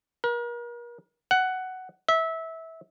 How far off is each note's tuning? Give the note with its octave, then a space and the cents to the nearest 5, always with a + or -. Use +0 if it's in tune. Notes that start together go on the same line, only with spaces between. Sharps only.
A#4 +40
F#5 +10
E5 -20